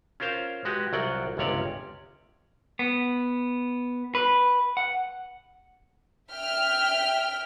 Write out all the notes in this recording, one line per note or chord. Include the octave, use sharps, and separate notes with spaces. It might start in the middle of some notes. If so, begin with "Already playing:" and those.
C#4 F4 A#4 C5 F5
G#3 F#4 G4 B4
C2 F#3 F4 D5 F#5 G5
G1 C#2 C3 C#4 C#5 D5
B3
B4
F#5
E5 G5 F6 B6